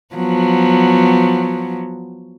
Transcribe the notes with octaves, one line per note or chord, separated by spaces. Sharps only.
F3 F#3 B3